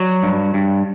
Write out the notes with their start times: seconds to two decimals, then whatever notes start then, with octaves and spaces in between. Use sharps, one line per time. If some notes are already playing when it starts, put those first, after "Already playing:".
Already playing: F#3 D5
0.23 G2
0.54 G2